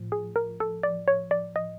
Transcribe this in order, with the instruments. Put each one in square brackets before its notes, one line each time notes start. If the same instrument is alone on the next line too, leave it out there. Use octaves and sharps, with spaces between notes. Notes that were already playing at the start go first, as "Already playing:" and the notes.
Already playing: [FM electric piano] A2 F3
[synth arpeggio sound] G#4
A#4
A4
D5
C#5
D5
D#5